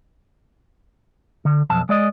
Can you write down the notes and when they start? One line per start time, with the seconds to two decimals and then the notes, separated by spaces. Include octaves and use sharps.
1.45 D3
1.70 B1 F2 A5
1.89 G#3 D5 D#5